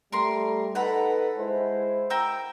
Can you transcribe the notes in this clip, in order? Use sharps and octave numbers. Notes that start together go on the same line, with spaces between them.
G3 A3 A#4 C6
D#4 A4 B4 F#5 A#5 B5
G#3 E4 C5
A#4 G5 E6